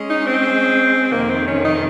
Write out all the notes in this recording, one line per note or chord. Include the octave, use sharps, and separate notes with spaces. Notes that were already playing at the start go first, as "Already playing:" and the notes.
Already playing: G#3 C#4 G#4 D#5
D#4
C4
F2 C3 D#3 A#3
C4
C#4
D#4